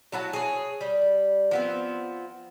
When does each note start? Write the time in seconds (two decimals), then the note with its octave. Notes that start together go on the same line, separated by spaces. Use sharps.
0.12 F#3 E4 F#4 A5
0.33 G#4 C#5
0.81 G3
1.51 F3 B3 C4